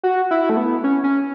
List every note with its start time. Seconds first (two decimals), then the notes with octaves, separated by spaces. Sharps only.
0.03 F#4
0.31 E4
0.49 A3
0.57 B3
0.84 C#4
1.04 C#4